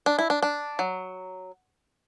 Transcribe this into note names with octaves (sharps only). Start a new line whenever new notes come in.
D4
E4
D4
D4
F#3